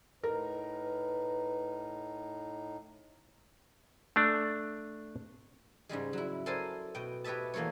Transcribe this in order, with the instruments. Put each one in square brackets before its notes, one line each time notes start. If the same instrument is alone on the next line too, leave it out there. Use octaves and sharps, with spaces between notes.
[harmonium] A2 D#4 [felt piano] A#4 [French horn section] B4
[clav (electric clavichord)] A3 D4
[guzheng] G#2 C#3 G3 G#3
F#3 E4
A4 A#4 C5 D5 G#5 A5
B2 G5
G4 B4 C#5 D#5 E5 A5
E2 A3 A#3 A4 C#5